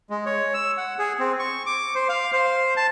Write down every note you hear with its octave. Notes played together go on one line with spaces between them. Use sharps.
G#3
C#5
E6
F#5
G#4
C4
C#6
D6
C5
F5
C5
A5